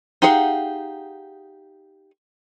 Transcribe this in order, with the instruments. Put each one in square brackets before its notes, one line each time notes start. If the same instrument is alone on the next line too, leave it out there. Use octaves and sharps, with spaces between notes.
[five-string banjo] D#4 G4 G#4 F5 F#5